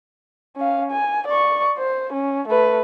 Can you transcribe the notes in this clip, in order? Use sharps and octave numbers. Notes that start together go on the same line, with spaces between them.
C#4 F5
G#5
D5 C#6
C5
C#4
A3 B4